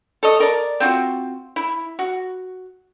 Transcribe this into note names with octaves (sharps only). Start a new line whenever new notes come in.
A4 C#5 D#5
A#4 D5
C4 F4 F#4
E4
F#4